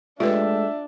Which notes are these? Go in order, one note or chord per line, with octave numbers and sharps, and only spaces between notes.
G#3 A3 D4 F4 G4 B4 E5